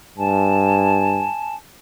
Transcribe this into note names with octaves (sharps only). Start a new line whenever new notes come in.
G2 G#5 A5